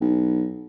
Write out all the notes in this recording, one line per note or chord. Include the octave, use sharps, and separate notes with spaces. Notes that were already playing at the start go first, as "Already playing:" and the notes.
B1